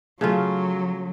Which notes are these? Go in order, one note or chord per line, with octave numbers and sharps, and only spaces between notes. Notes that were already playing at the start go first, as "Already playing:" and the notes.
C#3 F#3 A3 F4